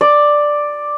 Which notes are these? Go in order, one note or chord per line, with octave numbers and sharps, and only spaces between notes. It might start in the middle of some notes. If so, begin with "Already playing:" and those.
D5